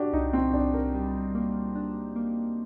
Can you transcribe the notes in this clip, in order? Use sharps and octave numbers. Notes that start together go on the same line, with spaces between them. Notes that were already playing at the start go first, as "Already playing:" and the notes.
Already playing: D4 F#4 G4
C2 D#4
C4
C2 D4
A#4
G3
A#3
D4
A#3